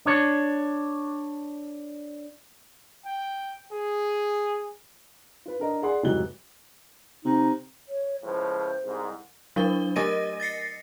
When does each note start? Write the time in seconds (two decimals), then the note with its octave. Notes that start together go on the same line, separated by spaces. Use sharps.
0.06 D4 C#5
3.05 G5
3.72 G#4
5.46 F4 B4
5.59 D4 A#4 D#5
5.82 G#4 D5 F#5 C6
6.03 F1 G#2 F#3 D#5 F#6 G7
7.25 C3 D#4
7.88 C#5
8.23 C#2 A2 F3 C5
8.84 C2 G#2
9.56 F#3 D4 A#4 G7
9.96 A3 A#4 D#5 A#6 D#7
10.40 A6 A#6 C7 C#7